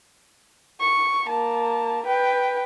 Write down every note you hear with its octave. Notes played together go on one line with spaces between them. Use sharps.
C#6
A#3 A5
B4 G5